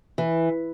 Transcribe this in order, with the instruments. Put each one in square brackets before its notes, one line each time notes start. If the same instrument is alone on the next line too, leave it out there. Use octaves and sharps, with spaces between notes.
[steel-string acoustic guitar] E3